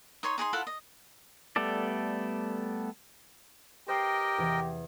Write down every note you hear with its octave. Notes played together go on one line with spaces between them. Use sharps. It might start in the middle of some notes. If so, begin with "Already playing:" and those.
D#4 C#5 C6
D#4 G#4 G5 C6
E4 F4 A4 F#5
D#5
G3 A3 B3 A4 D5
G4 A#4 C5 D#5 G5 F#6 C7
E2 C3 E3